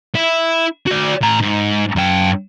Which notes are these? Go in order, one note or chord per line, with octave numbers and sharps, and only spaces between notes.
E4
F#4 D5
A2 A#5
G#2
F#2 G5